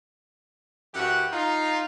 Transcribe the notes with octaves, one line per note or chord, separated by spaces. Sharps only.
F#2 E3 F#4 G4 F#5
D#4 F4